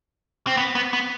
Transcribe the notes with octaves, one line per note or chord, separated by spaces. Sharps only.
C4
B3
B3
B3